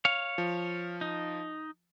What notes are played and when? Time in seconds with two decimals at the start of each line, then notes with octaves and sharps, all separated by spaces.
0.05 C#5 F5
0.38 F3
1.01 D#4